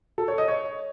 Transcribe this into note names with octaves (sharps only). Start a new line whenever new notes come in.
A4
C#5
D#5
C#5